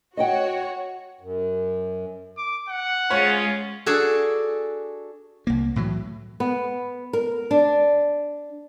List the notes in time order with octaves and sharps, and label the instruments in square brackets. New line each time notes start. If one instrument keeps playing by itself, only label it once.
[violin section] F#4 C#5 [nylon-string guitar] D#5 F#5 G5
[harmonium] F#2
[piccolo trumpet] D6
F#5
[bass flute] G#3 [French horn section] C#4 F4 [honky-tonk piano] C#5
[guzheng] D4 F#4 G#4 A4
[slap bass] C2 A#3
A2 E3 F#3
[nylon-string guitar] B3
A#4
D4